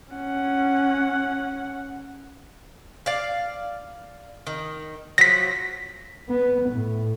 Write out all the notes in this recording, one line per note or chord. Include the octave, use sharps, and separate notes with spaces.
C#4 F#5
D5 F5
D#3
F3 F#3 A#6 B6
B3
A2